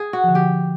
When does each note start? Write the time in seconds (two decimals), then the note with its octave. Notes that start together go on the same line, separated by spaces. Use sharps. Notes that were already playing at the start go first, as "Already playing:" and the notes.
Already playing: G#4
0.13 F#4
0.24 D3 F3
0.35 G4